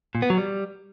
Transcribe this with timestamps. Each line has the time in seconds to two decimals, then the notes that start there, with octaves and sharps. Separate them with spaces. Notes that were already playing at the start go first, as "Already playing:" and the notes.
0.15 A#2
0.22 B3
0.30 F#3
0.38 G3